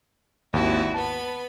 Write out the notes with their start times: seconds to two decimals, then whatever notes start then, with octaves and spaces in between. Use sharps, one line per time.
0.53 G#1 D#2 E4 F#4
0.94 B3 A5 B5